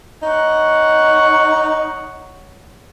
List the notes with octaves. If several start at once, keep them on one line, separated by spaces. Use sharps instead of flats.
D#4 C#5 F#5